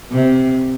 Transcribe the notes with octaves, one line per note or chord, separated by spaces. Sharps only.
C3